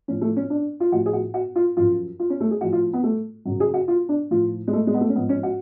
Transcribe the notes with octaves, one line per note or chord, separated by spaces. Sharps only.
A2 F3 C#4
A3
C#4
D4
F4
A2 F3 F#4
G#4
F#4
F#4
F4
F#2 F3 F4
F4
C#4
A3
G#4
A2 F3 F#4
F4
B3
A3
F#2 C#3 F#3
G#4
F#4
F4
D4
A2 F3 F4
G#3
A3
G#3
B3
A3
C#4
G#2 F3 B3
C#4
F#4